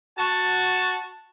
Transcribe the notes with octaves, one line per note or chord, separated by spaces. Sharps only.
F#4 A5